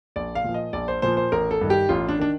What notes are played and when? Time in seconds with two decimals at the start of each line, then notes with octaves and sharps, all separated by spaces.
0.16 A#1 D5
0.35 F5
0.44 A#2 F3
0.54 D#5
0.73 A#1 D5
0.88 C5
1.02 A#2 F3 C5
1.17 C5
1.32 A1 A#4
1.51 A4
1.61 G2 D#3
1.70 G4
1.89 A1 F4
2.09 D4
2.19 D#3 D4